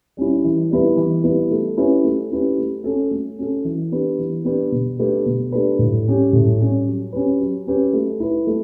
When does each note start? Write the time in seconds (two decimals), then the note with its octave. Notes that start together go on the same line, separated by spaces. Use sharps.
0.17 G3 C#4 E4
0.44 E3
0.71 G3 B3 E4 B4
0.97 E3
1.24 G3 B3 E4 B4
1.51 A3
1.77 C#4 E4 G4 B4
2.04 A3
2.31 C#4 E4 G4 B4
2.58 A3
2.84 C#4 F#4 A4
3.11 A3
3.39 C#4 F#4 A4
3.65 E3
3.92 B3 D4 G4 B4
4.19 E3
4.45 B3 D4 G4 B4
4.72 B2
4.99 A3 D4 G4 B4
5.26 B2
5.52 A3 D4 G4 B4
5.79 A2
6.06 G3 C#4 G4
6.33 A2
6.59 G3 C#4 G4
6.87 F#3
7.13 C#4 G4 B4
7.39 F#3
7.67 C#4 G4 B4
7.93 A3
8.20 E4 B4
8.47 A3